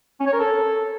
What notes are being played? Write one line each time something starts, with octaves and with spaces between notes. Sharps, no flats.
C#4
C#5
A#4
A4